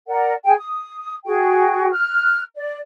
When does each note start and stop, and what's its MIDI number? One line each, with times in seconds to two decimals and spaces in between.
0.08 0.33 70
0.08 0.33 74
0.08 0.33 78
0.45 0.53 68
0.45 0.53 79
0.45 0.53 80
0.58 1.15 87
1.25 1.90 66
1.25 1.90 68
1.25 1.90 79
1.91 2.41 89
1.91 2.41 90
2.55 2.77 74